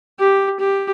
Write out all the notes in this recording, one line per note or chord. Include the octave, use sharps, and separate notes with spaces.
G4
G4